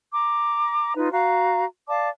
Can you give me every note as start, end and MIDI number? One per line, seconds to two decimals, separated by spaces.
0.13 0.95 82
0.13 0.95 86
0.96 1.11 63
0.96 1.11 65
0.96 1.11 71
1.12 1.65 66
1.12 1.65 77
1.12 1.65 82
1.89 2.08 74
1.89 2.08 77
1.89 2.08 81
1.89 2.08 86